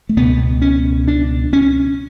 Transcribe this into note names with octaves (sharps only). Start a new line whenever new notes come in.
A3
C#2 B2 B3
C#4
D4
C#4